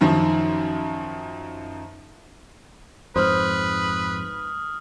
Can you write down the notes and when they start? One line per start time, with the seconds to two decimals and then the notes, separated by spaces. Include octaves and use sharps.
0.01 F#2 D#3 F3
3.16 F2 G#2 B4 C5 D#6 F6